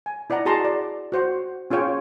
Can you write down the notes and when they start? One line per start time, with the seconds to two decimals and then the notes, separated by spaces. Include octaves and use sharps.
0.06 G#5
0.30 E4 D5 D#5 F#5 A#5
0.45 F#4 G#4 D#5 A5 A#5 C6
0.65 D5
1.12 F#4 C5 F#5
1.71 C#4 F4 G#4 C#5 G5